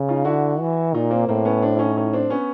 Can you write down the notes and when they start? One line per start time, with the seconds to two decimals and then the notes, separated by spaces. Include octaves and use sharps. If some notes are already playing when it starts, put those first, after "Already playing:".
Already playing: C#3
0.08 D#4 F4
0.25 D3 E4 F#4
0.60 E3
0.94 A#2 D#4 F4
1.10 A#3 C4
1.28 A2 A#3 C4
1.45 B3 C#4
1.62 C4 D4
1.76 E4
1.79 C#4 D#4
1.97 C#4 D#4
2.13 C4 D4
2.30 B3 C#4